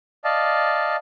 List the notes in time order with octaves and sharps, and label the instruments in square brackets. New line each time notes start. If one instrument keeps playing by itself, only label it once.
[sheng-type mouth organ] D5 D#5 F5 A5